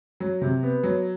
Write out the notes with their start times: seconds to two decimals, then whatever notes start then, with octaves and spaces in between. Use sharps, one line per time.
0.20 F#3
0.41 C3
0.63 B3
0.83 F#3